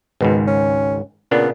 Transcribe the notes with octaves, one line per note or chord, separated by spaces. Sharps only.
G#1 C#2 G#2 B2
C#4
A#2 C#3 B3 D4